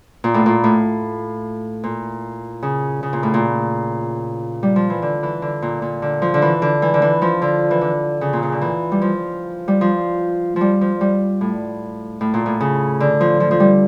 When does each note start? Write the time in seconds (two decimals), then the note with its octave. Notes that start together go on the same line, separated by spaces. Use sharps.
0.24 A#2
0.34 A2
0.46 A#2
0.64 A2
1.84 A#2
2.63 C#3
3.03 C#3
3.13 A#2
3.23 A2
3.34 A#2
4.63 G3
4.76 F3
4.90 E3
5.02 D3
5.23 E3
5.42 D3
5.62 A#2
5.82 A#2
6.02 D3
6.22 F3
6.34 D3
6.42 E3
6.62 D3
6.82 E3
6.94 D3
7.02 E3
7.22 F3
7.42 D3
7.71 E3
7.81 D3
8.21 C#3
8.33 A#2
8.43 C#3
8.52 D3
8.62 E3
8.92 G3
9.02 F3
9.68 G3
9.81 F3
10.56 F3 G3
10.81 F3
11.01 G3
11.41 A2
12.21 A2
12.34 A#2
12.46 A2
12.60 C#3
13.00 D3
13.21 F3
13.40 F3
13.51 F3
13.60 G3